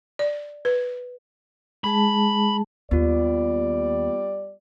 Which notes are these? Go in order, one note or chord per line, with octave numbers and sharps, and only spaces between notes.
D5
B4
G#3 G#4 A5 B5
D#2 G3 B3 F4 D5